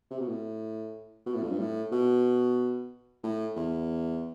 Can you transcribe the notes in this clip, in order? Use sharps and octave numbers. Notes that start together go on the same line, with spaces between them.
C3
B2
A2
B2
A2
F2
G2
A2
B2
A2
E2